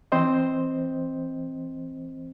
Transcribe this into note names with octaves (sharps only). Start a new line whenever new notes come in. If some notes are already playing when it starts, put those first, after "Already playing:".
E3 C4 C5 D#5